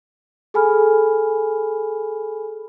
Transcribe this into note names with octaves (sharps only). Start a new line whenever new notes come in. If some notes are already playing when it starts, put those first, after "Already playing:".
G#4 A4 G#5 B5 F6